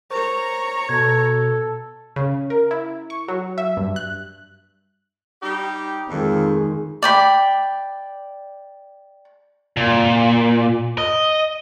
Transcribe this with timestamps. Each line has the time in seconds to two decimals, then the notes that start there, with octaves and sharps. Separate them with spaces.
0.10 A#4 C5 C#5 A#5 C#6
0.89 B2 A4 G#6
2.16 C#3
2.50 A#4
2.71 E4
3.10 C#6
3.28 F#3
3.58 E5
3.77 G2
3.96 F#6
5.42 G3 D#4 G4
6.10 F2 D#3 G#3
7.02 D5 G5 B5
9.77 A#2
10.98 D#5